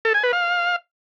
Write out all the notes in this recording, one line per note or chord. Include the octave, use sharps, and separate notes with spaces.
A4
G#5
B4
F5